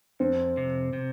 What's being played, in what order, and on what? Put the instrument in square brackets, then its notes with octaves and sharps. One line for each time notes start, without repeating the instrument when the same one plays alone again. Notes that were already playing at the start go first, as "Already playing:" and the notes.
[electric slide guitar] F2 [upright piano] C4
[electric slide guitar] C3
C3